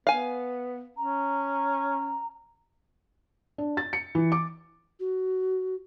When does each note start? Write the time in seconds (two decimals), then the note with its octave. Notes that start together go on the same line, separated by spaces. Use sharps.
0.07 B3 F5 G#5
0.97 C#4 A#5
3.58 D4
3.77 A6
3.93 C#7
4.15 E3
4.32 D6
5.00 F#4